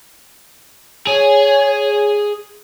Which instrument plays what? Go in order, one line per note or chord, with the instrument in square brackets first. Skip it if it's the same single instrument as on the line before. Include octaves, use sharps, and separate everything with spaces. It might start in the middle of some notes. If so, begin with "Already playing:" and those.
[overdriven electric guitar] G#4 [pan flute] C#5